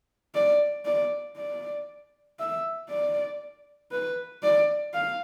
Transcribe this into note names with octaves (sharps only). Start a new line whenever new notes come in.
D5
D5
D5
E5
D5
B4
D5
F5